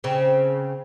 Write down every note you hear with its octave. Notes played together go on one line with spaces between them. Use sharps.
C#3 C4